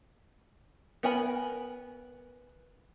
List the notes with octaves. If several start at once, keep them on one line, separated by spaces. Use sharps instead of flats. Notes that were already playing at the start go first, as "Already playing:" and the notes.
B3 A#4 G#5 B5